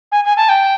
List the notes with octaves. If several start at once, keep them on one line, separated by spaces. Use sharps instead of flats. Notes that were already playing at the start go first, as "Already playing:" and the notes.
G#5
G#5
A5
G5